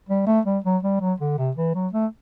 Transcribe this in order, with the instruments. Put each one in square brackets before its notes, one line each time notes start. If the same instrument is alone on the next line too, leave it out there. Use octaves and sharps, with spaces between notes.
[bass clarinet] G3
A3
G3
F#3
G3
F#3
D3
C3
E3
F#3
A3